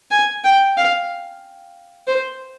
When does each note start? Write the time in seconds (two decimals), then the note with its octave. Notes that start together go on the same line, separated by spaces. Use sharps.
0.11 G#5
0.44 G5
0.77 F5
2.07 C5